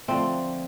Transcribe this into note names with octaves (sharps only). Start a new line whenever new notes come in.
D3 F3 A3 C4